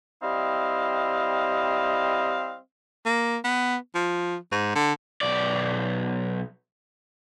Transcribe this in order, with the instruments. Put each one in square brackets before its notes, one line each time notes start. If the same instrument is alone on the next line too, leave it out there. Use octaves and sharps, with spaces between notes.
[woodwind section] G3 C4 E4 D#5 F5
[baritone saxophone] A#3
B3
F3
G#2
D3
[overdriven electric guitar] B1 D5